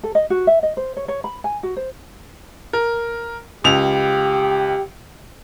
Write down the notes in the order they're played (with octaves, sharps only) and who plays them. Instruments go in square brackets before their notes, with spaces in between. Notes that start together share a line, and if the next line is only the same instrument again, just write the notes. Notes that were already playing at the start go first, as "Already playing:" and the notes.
[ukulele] A4
D#5
F#4
E5
D#5
C5
C#5
C#5
B5
G#5
F#4
C5
[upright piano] A#4
[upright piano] C#2 F7 [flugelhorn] G4